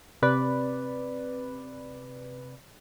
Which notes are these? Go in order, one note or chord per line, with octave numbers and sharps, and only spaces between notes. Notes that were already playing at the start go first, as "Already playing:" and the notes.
C3 B4 D5